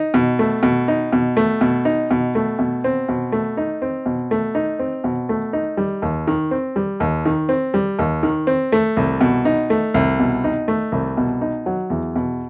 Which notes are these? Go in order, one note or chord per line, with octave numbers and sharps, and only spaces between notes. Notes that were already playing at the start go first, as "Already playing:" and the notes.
Already playing: D#4
B2
A3
B2
D#4
B2
A3
B2
D#4
B2
A3
B2
C4
B2
A3
D#4
C4
B2
A3
D#4
C4
B2
A3
D#4
G3
D#2
D#3
C4
G3
D#2
D#3
C4
G3
D#2
D#3
C4
A3
C2
B2
D#4
A3
C2
B2
D#4
A3
C2
B2
D#4
F#3
E2
B2